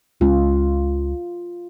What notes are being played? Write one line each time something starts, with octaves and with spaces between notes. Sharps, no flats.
C#2 G#3 C#4 F4